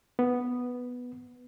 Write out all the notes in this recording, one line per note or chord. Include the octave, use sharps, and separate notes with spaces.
B3